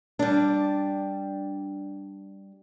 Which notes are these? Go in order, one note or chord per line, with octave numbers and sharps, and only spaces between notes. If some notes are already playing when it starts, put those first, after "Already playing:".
G3 D4